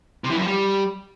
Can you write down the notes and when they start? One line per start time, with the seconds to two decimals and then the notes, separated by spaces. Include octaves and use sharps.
0.24 C3
0.30 E3
0.36 F#2
0.41 F3
0.47 G3